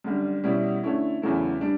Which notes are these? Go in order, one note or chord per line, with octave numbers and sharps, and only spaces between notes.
F#2 D3 G3
B2 G3 C#4 E4
D3 A3 C#4 E4
E2 C#3 F#3 A3 E4
G3 D4